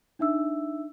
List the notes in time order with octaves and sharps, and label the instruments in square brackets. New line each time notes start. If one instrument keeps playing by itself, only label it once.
[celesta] D4 D#4 E5 E6